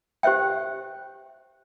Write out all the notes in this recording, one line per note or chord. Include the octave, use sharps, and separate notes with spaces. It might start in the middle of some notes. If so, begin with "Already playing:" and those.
G4 C5 C#5 E5 G5